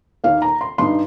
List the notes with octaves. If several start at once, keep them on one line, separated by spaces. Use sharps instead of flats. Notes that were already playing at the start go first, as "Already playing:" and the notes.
D#2 D#3 A#3 F5
A#5
C6
G2 G3 D#4 C6